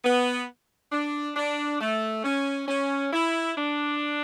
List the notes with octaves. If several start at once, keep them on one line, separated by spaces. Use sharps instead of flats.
B3
D4
D4
A3
C#4
C#4
E4
D4